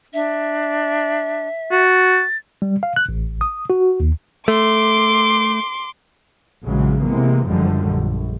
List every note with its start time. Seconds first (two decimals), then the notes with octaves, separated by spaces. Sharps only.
0.14 D4 E5
1.72 F#4 A6
2.62 G3
2.83 F5
2.96 F#6
3.09 A1
3.41 D#6
3.70 F#4
4.00 D#2
4.48 A3 C6 D6
6.65 A#1 C#3 E3 F#3 G#3
7.03 C3 E3 G#3 A#3 B3
7.48 F#1 F#2 D3 F3 G3 G#3
7.89 A#1